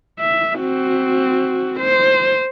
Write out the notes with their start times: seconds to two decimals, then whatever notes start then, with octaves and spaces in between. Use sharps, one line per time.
0.19 E5
0.57 C4 F#4
1.80 C5